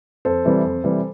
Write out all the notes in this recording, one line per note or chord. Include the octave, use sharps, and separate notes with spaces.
F2 A4 C5
C3 E3 G3
F2
C3 E3 G3